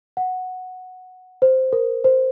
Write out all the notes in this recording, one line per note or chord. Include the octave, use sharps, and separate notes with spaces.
F#5
C5
A#4
C5